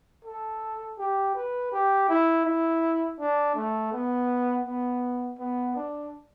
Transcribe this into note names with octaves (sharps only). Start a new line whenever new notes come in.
A4
G4
B4
G4
E4
E4
D4
A3
B3
B3
B3
D4